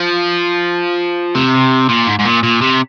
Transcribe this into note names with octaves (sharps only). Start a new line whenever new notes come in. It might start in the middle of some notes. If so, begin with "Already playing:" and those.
Already playing: F3
C3
A#2
G#2
G#2
A#2
A#2
C3